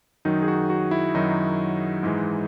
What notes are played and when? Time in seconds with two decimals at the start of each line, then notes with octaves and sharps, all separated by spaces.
0.25 F#2 D#3 F#3 D#4
0.42 G#4
0.48 F#4
0.70 F#4
0.91 E4
1.14 F#2 D#3 F#3 D#4
2.03 G#2 E3 G#3